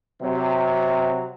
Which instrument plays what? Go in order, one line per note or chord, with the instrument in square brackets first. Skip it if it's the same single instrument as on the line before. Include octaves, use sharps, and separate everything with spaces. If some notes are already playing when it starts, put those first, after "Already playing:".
[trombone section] C3 F#3